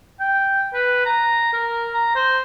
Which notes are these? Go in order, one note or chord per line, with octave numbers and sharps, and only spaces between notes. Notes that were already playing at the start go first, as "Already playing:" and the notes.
G5
B4
A#5
A#4
A#5
C5